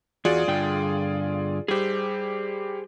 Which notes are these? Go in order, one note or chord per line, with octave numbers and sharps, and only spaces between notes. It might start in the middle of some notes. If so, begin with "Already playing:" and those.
E2 F4 F#4 G#4 D5
G2 D3 G5
G3 G4 G#4 C5